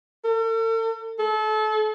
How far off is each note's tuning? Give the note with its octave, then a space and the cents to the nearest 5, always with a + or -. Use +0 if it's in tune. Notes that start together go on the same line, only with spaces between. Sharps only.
A4 +45
A4 -30